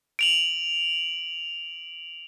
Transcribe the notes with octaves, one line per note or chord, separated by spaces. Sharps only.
D7 F7 F#7